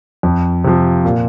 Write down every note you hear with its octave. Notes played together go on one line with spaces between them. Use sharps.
F2
C3 F3
A#2